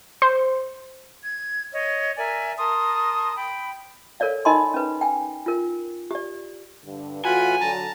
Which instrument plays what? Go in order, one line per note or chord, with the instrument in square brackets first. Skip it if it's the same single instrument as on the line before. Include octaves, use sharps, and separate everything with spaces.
[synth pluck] C5
[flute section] G#6
C#5 D#5
A#4 D5 E5 G#5
A#4 A5 C6 D#6
G5 B5
[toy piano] A4 A#4 C#5 D5 F5
D#4 A#4 D#5 G#5 B5 C6
C#4 B4
G5 G#5
F4 A#4
G4 D5
[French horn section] G2 D3
[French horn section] A2 E3 F#4 [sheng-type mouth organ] F4 F#5 B5 [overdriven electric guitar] G#5
[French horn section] D3 F#3 [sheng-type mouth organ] A5 A#5